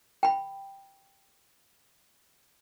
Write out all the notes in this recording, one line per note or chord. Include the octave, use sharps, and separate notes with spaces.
G5 B5